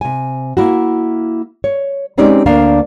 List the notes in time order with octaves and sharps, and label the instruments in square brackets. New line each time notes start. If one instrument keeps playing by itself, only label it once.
[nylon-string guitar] C3 G#5
A#3 E4 F#4
C#5
G#3 C4 C#4 D#4 G4 D5
D2 A#3 D4 F5